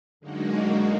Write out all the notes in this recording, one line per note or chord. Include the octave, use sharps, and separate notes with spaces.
F#2 D3 G#3 A#3 D#4 F#4